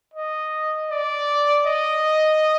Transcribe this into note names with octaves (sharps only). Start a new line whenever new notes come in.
D#5
D5
D#5